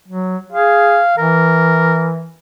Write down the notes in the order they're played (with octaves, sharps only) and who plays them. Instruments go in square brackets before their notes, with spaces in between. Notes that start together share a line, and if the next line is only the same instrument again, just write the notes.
[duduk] F#3
[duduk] G#4 [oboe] F5
[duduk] E3 [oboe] A#4